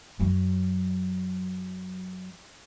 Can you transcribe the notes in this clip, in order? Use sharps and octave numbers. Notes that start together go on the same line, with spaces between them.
F#2 F#3